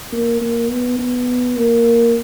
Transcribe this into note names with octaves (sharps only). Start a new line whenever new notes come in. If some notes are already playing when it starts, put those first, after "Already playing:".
A#3
A#3
B3
B3
A#3